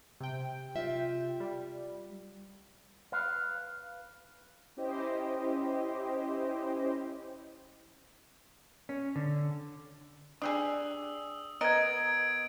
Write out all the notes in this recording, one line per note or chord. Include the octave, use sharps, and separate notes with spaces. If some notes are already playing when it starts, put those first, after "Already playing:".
C3 G5
F4 E5
G3
B4 F5
C#4 E4 G4 C5 D#5
C#4
D3
D4 G4 G#4 D#6 E6
B3 A#4 D#5 G#6 D7